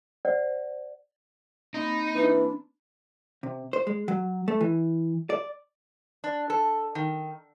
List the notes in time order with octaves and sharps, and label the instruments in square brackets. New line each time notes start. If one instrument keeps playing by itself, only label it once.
[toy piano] C5 D5 F#5
[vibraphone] A#3 C4 B5 [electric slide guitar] D#4
[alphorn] E3 [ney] D4
[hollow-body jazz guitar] C3
C5
G#3
F#3
A3
E3
D5
[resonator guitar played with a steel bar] D4
A4
D#3